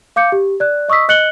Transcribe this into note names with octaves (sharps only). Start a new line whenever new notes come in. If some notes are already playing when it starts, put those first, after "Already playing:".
F5 D6 G6 C#7
G4
D5 F#6
D#5 C#6 D#6 E6 B6
D#5 F#6 C#7 F#7 G7